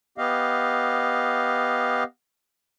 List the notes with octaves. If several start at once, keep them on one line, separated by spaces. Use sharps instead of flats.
B3 G4 D#5 F5